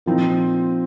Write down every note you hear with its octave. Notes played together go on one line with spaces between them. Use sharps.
A#2 F3 C4 D#4